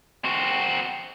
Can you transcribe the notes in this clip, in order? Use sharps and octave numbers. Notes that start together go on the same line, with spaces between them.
C4 F#4